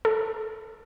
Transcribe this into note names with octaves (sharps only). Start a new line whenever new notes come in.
A4